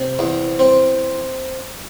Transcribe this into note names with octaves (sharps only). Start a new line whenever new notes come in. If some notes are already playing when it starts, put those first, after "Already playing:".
Already playing: C3
E2
C4